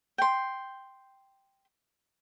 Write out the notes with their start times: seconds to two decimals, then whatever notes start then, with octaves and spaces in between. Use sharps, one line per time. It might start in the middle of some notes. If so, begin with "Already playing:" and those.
0.18 G5 C6